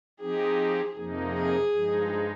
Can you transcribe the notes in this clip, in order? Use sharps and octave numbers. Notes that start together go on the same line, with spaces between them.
F3 C4 D#4 G4 G#4
F2 C3 F3 A#3 D#4
G#4
G2 F3 G#3 D#4